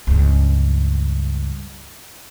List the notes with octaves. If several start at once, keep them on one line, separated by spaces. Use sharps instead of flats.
C#2 G2